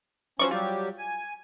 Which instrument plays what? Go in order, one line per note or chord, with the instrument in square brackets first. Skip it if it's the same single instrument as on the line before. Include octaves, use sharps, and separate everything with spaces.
[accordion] F3 F#3 C#4 [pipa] C5 D5 C#6
[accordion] F#3 G3 G4 [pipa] F4
[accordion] G#5